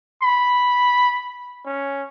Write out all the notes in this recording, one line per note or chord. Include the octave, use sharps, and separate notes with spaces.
B5
C#4